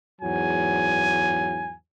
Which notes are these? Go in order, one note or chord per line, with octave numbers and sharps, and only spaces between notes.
E2 G#2 F#3 G#5